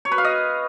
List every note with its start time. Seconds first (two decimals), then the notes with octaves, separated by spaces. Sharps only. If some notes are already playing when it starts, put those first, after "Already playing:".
0.05 C#5
0.12 B4
0.18 F5
0.24 D#5